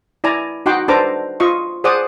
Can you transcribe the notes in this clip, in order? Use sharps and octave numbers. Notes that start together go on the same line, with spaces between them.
E4 D5 G#5 A#5
D#4 F#4 F#5 G5 C6 D6
D4 A4 B4 C5 A#5 D6
F4 D#5 C#6
G#4 C5 D5 F#5 D6 D#6